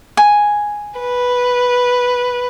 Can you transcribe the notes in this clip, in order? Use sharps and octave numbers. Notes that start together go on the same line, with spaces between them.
G#5
B4